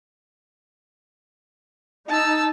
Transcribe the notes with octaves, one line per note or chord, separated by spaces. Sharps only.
D#4 A5 E6